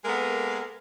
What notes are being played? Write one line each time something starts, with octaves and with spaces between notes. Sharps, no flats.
G#3 A#3 B3 A4 A#4